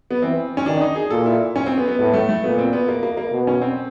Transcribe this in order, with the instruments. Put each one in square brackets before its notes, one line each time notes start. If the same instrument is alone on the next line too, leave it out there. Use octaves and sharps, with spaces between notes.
[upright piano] B3
[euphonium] E3 [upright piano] C4
[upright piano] C#4
[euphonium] D#3 [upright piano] D4
[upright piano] D#4
G#4
[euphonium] A#2 [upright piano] A4
[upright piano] E4
C#4
C4
B3
B3
[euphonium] A2 [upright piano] B3
[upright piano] A3
A3
[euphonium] A#2 [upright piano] B3
[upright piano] C4
B3
A#3
A#3
A#3
[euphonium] B2
[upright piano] C#4
C4